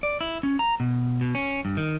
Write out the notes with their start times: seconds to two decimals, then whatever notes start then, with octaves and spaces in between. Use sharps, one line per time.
0.03 D5
0.21 E4
0.43 C#4
0.59 A#5
0.80 B2
1.21 B2
1.35 C#4
1.65 G2
1.77 D#3